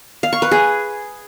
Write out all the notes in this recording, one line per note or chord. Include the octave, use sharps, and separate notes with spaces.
F5
C#6
B4
G#4